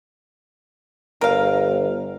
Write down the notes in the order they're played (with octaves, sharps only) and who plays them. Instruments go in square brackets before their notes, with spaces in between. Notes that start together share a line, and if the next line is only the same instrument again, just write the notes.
[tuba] G1 [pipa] A#4 F5